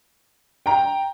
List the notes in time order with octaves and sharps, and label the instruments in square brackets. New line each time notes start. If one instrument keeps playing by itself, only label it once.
[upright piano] G5 A#5